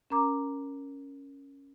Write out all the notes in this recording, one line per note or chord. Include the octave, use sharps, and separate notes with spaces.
C#4 A#4 A#5 D6